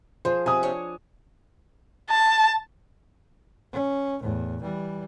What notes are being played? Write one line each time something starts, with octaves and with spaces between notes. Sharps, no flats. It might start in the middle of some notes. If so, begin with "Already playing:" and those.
F3 G#4 C5
C3 G#5 D#6
D4 C#5
A5
C#4
E2 A2
E3 G3